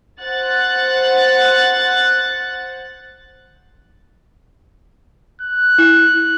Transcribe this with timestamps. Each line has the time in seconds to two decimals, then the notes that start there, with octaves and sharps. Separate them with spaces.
0.22 C5 F#5 F#6 A6
5.41 F#6
5.78 E4